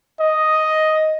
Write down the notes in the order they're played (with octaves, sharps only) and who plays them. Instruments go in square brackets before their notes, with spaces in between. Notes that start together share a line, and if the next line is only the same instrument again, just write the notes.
[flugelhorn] D#5